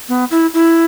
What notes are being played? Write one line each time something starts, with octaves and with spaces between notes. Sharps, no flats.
B3
E4
E4